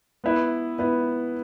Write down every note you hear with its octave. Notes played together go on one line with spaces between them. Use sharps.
B3 E4 B4
B3 E4 B4